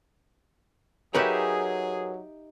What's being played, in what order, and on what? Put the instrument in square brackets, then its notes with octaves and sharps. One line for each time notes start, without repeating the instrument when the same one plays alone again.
[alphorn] F#3 [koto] D#4 G4 E5 [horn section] G#4 [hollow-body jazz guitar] A#4 B4 C#5